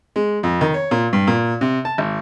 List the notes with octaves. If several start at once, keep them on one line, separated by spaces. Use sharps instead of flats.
G#3
F2
D#3
C#5
A#2
G2
A#2
C3
A5
G#1